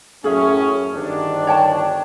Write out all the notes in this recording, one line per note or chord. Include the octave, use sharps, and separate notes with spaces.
F#2 A2 C#4 G#4 E5
G1 D#3 D4
C#5 G5 A5